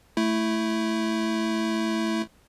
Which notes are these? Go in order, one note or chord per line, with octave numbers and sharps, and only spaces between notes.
A3 E4